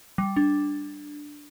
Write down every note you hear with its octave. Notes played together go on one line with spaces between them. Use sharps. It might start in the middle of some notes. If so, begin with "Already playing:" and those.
G3
D4